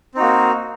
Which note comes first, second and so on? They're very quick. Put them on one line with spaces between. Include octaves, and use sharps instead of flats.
C4 D#4 F#4 A#3